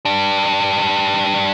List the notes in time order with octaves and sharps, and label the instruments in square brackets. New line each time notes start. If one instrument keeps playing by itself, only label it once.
[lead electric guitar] G3 D4